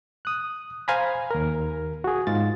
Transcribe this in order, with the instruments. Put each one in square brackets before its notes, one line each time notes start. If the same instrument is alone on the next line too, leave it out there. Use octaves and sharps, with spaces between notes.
[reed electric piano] D#6 F#6
C5 F5 G#5 A#5 B5
D#2 A#4
F#4 G#4
G#2 F4 A6